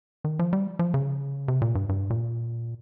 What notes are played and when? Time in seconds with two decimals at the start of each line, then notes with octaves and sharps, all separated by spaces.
0.24 D#3
0.39 F3
0.53 G3
0.79 F3
0.94 C#3
1.48 C3
1.62 A#2
1.75 G2
1.89 G2
2.10 A#2